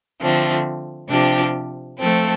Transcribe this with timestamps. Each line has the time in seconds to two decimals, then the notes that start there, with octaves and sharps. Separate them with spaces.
0.20 D3 F3 A3 C4
1.09 C3 F3 D4 G4
1.99 F3 A3 C4 A4